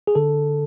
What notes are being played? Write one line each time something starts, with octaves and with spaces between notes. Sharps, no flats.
G#4
D3 A4